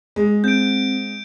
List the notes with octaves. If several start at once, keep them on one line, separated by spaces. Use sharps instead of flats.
G#3
C4 G6 D7